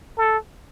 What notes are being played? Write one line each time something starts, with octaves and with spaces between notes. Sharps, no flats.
A4